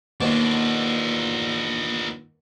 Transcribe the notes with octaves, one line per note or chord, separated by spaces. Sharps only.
D#2 B2 D4 F4